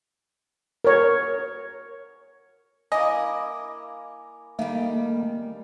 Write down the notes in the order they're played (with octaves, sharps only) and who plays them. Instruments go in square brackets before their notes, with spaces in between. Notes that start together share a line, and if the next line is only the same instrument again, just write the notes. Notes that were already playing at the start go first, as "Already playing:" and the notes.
[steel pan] A#4 C#5
[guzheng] A#3 E4 [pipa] D#5 [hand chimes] G#5 D6
[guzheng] D#3 G3 [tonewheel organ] A3 A#3